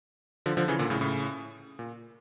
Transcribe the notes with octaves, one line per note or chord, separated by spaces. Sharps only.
D3 F3
D3 F3
C#3 E3
A#2 D3
A2 C#3
A2 C#3
A#2